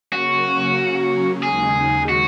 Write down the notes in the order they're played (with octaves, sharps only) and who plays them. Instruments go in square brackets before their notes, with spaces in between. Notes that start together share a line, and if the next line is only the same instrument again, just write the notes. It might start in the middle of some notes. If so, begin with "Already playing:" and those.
[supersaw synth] C#3 F#3 A#3 C#4 [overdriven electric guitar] F#4
[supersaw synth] D#2 C#3 G#3 D#4 [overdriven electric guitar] G#4
[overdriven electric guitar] F#4